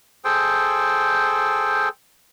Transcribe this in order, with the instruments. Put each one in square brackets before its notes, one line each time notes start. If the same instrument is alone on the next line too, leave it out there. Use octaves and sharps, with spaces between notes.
[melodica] G#4 A4 C5 G5